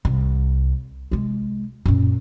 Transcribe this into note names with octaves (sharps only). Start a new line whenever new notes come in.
C2
C3 G#3
F#2 A#2